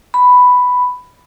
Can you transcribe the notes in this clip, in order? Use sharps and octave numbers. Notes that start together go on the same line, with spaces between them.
B5